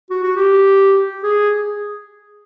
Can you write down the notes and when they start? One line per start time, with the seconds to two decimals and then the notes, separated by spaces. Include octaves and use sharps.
0.10 F#4
0.23 F#4
0.36 G4
1.23 G#4